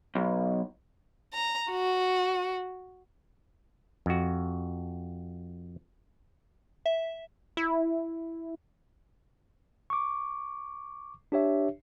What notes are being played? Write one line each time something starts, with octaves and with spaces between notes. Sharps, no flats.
B1
A#5
F#4
F2 F#4
E5
E4
C#6 D6
D4 G4 C#5 E5